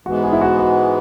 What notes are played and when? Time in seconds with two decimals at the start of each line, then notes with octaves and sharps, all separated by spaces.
0.06 G#2 E3 G#3 B3 F#4
0.24 G#4
0.32 E4
0.41 F#4
0.59 F#4